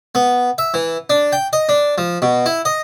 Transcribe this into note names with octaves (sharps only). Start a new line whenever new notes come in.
B3
E5
E3
D4
G5
D#5
D4
F3
B2
E4
D#5